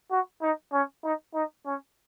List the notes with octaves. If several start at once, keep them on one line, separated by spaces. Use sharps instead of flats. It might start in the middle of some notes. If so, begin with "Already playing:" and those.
F#4
D#4
C#4
D#4
D#4
C#4